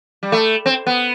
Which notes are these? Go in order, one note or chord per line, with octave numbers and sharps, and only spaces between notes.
G3
A3
C4
B3